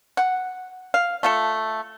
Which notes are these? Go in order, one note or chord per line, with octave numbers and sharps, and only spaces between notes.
F#5
F5
A3 F4 A4